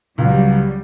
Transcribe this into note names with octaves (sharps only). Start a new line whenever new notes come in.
C#2 F#3 G3